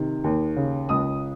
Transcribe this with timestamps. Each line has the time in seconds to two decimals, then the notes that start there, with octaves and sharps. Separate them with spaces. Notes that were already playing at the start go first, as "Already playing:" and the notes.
Already playing: C3 D#3
0.24 D#2
0.56 C#3
0.89 C#2 D#6